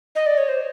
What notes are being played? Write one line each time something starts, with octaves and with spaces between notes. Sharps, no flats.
D#5
D5
C#5
C5